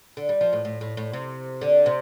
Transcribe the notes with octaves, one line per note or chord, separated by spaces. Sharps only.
D3
G3
F3
A2
A2
A2
A2
C3
D3
C3